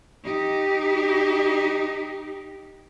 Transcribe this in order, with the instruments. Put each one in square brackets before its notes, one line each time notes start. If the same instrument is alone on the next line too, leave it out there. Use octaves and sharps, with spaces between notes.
[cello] D#4 G4